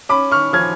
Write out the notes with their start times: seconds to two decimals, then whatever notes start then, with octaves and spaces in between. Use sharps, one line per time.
0.09 C#4 B5 D6
0.31 C#6 F6
0.53 F3 F6 G#6